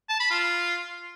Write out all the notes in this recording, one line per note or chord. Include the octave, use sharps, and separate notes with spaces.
A5
B5
F4